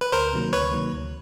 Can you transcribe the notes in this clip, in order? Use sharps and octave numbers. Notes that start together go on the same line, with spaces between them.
B4
D2 A#4 C5
C3 D#3 F#3 A#3
D2 B4 C#5
C3 D#3 F#3 A#3
D2